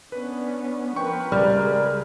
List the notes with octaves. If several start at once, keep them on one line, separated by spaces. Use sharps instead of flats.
B3 C#4 D4 B4
F3 A#4 B4 G5 C#6
C#2 G3 G#4 A#4 B4 D5 F6